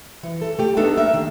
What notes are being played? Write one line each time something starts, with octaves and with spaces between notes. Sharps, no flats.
E3
A4
A3 G4
A3 B3 D4 D#4 A4
A#3 E5
D#3